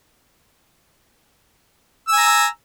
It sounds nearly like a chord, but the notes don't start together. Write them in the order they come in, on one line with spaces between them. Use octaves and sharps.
E6 G#5 A#5